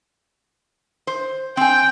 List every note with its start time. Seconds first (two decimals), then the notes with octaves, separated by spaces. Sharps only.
1.07 C5
1.57 C4 G5 G#5